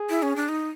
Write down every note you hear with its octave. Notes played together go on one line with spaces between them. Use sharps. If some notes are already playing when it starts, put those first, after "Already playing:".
Already playing: G#4
E4
C#4
D4
D#4